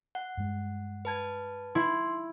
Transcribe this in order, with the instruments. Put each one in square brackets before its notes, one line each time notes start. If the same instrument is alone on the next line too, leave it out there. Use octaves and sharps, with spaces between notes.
[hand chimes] F#5
[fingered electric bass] G2 G#3
[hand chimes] B4 A5 G#6
[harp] E4 [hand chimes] C6